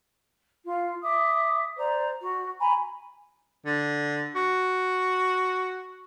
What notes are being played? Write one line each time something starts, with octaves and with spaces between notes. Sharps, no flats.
F4
E5 D6 D#6
C5 D5 A#5
F#4
G#5 A#5 B5
D3
F#4